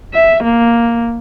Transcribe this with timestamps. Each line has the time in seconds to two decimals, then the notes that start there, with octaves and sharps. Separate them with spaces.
0.14 E5
0.43 A#3